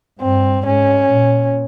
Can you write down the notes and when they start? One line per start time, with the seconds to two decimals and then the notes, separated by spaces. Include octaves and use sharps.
0.21 G2 C4
0.66 G#2 C#4
1.12 A#2